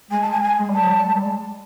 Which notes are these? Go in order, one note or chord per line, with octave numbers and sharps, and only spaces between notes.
G#3 G#5
A5
G#5
G#5
G#3
G3 A5
F#3
G3
G#3
G3
G#3